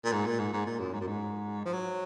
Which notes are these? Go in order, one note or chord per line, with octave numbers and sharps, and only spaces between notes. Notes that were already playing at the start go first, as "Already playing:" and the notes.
A#2
G#2
A#2
G#2
G#2
A#2
F#2
G#2
F#2
G#2
F3
F#3